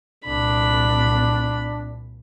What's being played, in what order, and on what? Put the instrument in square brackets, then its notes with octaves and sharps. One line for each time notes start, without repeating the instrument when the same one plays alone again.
[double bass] C2 A#2 [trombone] D4 [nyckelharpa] B5